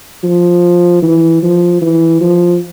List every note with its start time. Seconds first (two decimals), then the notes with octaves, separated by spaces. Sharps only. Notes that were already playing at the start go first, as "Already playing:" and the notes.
0.23 F3
1.02 E3
1.43 F3
1.82 E3
2.21 F3